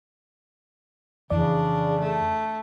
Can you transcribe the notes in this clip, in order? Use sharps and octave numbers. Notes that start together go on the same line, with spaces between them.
F2 C#3 E3 D4 D5
A3